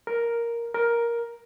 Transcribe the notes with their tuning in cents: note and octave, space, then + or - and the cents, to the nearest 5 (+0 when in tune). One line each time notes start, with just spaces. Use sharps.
A#4 +5
A#4 +10